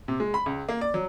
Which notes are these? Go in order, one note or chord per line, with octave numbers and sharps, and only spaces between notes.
C3
G#3
B5
C#2
A#3
D5
F#3